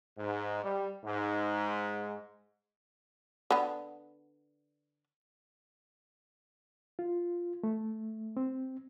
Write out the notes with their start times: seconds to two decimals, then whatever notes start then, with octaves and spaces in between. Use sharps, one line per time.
0.16 G#2
0.62 G3
1.04 G#2
3.51 D3 B3
6.99 F4
7.63 A3
8.37 C4